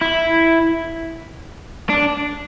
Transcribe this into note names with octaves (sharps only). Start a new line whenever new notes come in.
E4
D4